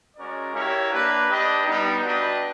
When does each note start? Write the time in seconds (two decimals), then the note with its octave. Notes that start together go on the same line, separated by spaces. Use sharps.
0.17 G#3 C#4 F#4 A#4 D5
0.54 E4 G4 A#4 C#5 F5
0.91 A#3 D4 G4 B4
1.28 D4 G4 B4 D#5
1.65 G3 B3 D#4
2.03 D4 F#4 B4 D#5 G5